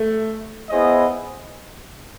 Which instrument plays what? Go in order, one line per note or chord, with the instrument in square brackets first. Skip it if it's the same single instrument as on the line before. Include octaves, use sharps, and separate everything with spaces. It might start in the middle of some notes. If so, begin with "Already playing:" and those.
Already playing: [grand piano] A3
[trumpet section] B3 E4 G#4 C5 D#5